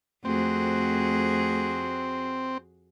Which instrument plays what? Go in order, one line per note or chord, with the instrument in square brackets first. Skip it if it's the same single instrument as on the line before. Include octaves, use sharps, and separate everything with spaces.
[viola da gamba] F2 F#4 G#4 [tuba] A3 [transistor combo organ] C4